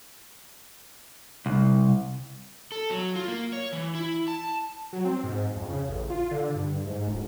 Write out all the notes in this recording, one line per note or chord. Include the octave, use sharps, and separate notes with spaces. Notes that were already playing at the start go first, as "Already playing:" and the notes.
C2
A4
F#3
F4
A#3
C#5
E3
E4
A5
F#3
C4
G#2
F2
C#3
A1
F4
D3
G2
G#2
D1